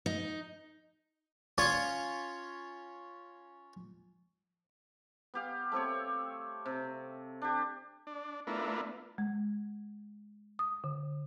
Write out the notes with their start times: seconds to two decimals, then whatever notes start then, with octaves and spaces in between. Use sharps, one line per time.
0.06 D#4
1.58 C#4 F4 C#5
5.34 B3 G4 F5
5.72 A3 C4 G4 C#5
6.66 C3
7.42 D4 G4
8.07 D4
8.47 A3 B3 D4 E4 F4 A#4
9.18 G#3
10.59 D#6
10.84 D3